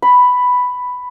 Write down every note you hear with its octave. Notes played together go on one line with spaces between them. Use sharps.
B5